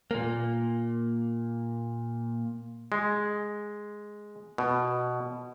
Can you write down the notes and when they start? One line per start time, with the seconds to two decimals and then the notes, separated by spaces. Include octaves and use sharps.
0.11 A#2 A#3
2.92 G#3
4.58 B2